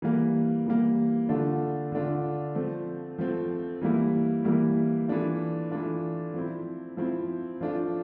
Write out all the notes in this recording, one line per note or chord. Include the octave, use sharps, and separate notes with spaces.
E3 G3 A#3
E3 G3 A#3
D3 A3 D4 F4
D3 A3 D4 F4
F3 A3 C4
F3 A3 C4
E3 G3 A#3 E4
E3 G3 A#3 E4
E3 A3 D4 F4
E3 A3 D4 F4
F3 C4 E4
F3 C4 E4
F3 A3 D4 F4